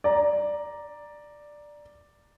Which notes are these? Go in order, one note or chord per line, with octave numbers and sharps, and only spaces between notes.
D5 A#5